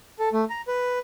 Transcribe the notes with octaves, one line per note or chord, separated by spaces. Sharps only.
A4
A3
A#5
B4